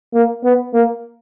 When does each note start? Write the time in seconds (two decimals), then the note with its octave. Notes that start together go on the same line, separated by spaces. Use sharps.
0.14 A#3
0.44 B3
0.73 A#3